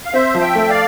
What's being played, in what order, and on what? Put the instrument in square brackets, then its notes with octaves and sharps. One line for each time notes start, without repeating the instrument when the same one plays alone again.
[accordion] F5
[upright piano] C4 [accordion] C5 E5
[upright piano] F3
[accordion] E5 G5
[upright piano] A3
[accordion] D5 F5